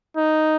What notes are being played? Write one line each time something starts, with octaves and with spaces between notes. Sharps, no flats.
D#4